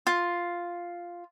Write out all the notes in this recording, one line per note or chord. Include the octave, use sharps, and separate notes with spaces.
F4